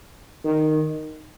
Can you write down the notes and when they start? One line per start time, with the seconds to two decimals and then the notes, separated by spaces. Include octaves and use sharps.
0.44 D#3